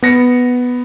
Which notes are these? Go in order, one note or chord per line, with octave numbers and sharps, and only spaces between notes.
B3 A#6 C#7